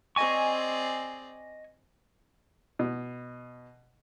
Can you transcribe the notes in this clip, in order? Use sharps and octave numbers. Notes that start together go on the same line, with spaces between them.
C4 G#4 D5 D#5 G#5 C#6
B2